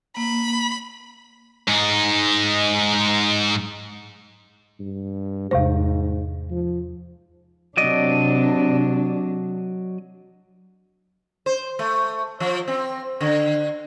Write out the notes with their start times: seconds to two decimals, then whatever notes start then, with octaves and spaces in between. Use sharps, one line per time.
0.17 A#3 B5
1.67 G#2 D#4
4.79 G2
5.51 E2 G#2 C3 C5
6.50 F3
7.77 C3 F#3 D4 D5 D#5
11.46 C5
11.79 A3
12.40 F3
12.68 C4
13.21 D3